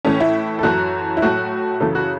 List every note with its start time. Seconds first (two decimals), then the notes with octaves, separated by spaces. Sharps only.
0.05 A2 E3 A3 C#4
0.20 E4
0.59 A4
0.63 F#2 E3 A3 F#4
1.17 E4
1.22 A2 F#3 A3 F#4
1.80 F#2 C#3 E3 A3 A4
1.95 F#4